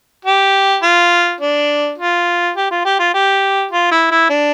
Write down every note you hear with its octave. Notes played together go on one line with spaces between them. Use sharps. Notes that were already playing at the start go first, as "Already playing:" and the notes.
G4
F4
D4
F4
G4
F4
G4
F4
G4
F4
E4
E4
D4